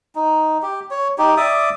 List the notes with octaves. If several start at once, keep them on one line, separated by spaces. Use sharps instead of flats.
D#4
G4
C#5
D#4 G4
D5 E5 D6 D#6